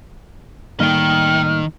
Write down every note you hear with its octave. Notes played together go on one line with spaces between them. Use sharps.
A2 D#3 G3 A#3 D#5 G5 F6